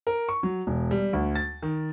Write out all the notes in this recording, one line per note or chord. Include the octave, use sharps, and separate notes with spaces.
A#4
C#6
F#3
E1
G3
D2
A6
D#3